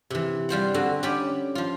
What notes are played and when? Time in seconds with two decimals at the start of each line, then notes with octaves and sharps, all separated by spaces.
0.10 C3 E3
0.49 G3 F4 C5 F#5
0.74 D3 C4 F#4
1.03 C#4 G4 C#5 D5 B5
1.55 F3 F4